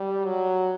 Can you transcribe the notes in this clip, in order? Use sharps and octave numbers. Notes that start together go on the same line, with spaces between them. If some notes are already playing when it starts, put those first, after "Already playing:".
Already playing: G3
F#3